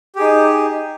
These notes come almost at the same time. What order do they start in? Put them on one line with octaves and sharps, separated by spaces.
G4 G#4 D#4